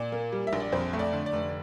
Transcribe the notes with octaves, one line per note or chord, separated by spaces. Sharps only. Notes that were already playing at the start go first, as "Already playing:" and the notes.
Already playing: A#2 D5
A#3
G3
E5
A#1
D5
F2 C5
A3
D5
D3
D5
F1